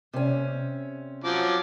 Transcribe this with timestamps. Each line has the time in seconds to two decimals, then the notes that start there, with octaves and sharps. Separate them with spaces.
0.13 C3 C#4
1.24 F3 F#3 D6